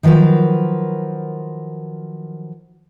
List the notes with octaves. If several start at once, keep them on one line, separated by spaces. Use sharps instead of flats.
D#3 F3 F#3 A#4 B4